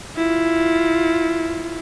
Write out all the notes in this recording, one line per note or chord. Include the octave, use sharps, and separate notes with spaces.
E4 F4